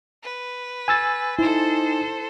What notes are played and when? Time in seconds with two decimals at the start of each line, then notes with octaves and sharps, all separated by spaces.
0.23 B4
0.88 G#5 E6 A6
1.39 D#4 E4 A4 C5